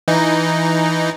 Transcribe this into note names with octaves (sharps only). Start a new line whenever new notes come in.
E3 D#4